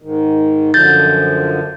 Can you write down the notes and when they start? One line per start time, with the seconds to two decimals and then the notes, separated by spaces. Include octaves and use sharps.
0.02 G#2 D#3
0.74 F#2 D3 F3 G6 A6